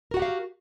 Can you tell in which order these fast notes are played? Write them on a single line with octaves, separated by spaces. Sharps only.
A#4 F#4 F#5 G4 F5